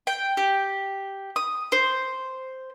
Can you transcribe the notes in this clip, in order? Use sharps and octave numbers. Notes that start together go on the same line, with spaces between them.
G5
G4
D#6
C5